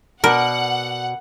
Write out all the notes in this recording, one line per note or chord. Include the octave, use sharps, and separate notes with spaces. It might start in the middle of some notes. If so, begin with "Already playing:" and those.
B2 A#4 D5 F#5